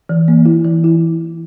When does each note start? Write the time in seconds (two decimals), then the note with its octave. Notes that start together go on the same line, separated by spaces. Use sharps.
0.09 E3
0.28 A#3
0.46 E4
0.64 E3
0.84 E4